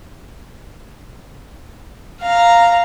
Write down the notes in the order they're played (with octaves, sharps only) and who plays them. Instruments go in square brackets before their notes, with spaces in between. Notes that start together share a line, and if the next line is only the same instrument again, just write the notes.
[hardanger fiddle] F5 A#5